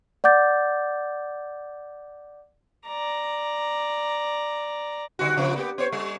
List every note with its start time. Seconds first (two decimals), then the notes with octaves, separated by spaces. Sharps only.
0.24 D5 F#5 D6 G6 A6
2.87 D5 A#5
5.19 D3 G3 F#4
5.37 C#3 F3 B3
5.56 A#3 B3 G4
5.78 B3 C5 C#5
5.92 G3